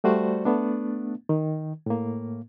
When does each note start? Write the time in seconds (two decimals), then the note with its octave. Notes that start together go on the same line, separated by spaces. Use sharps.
0.04 G3 A3 F#4 C5 D5
0.45 A3 B3 D4
1.29 D#3
1.86 A2 A#3